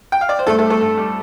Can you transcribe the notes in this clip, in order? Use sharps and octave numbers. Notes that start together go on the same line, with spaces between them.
G5
F5
D5
C5
G2 A3 A4
A3 A4
G3
A3 A4
G2
G3